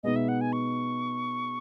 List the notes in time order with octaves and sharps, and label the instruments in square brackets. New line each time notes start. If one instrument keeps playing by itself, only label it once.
[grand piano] B2 G#3 B3 D#4 [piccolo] D#5
[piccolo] E5
F#5
G#5
C#6